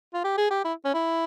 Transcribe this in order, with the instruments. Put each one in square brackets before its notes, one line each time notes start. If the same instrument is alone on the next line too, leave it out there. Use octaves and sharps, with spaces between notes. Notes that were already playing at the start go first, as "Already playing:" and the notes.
[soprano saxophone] F4
G4
G#4
G4
E4
C#4
E4